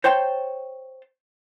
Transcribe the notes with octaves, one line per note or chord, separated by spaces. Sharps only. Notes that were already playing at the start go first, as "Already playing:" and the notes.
C5 C#5 G5 A5 C6